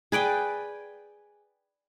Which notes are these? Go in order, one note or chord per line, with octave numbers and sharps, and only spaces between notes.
G#4 B4 D5 G5